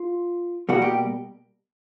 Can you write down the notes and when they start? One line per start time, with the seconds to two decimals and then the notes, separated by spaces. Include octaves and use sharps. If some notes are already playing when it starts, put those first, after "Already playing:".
Already playing: F4
0.69 B2 G3 A#3 F#4
0.82 G4